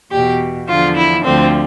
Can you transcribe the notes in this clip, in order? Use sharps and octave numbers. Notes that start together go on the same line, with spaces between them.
E2 B2 G4
E2 D3 F3 F4
E4
D2 D3 F3 C4